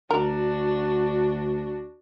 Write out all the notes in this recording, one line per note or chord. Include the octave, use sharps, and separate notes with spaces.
D2 D4 F#4 A#4